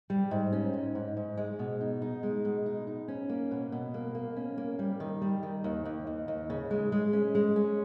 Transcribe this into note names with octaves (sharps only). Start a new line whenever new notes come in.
G3
G#2
C#4
G#2
G#2
G#2
G#3
B2
D#4
D#4
G#3
B2
D#4
D#4
C#4
A#3
B2
B2
A#3
A#3
C#4
A#3
G3
D#3
G3
D#3
D#2
D#2
D#2
D#2
C#3
G#3
G#3
C#4
G#3
C#4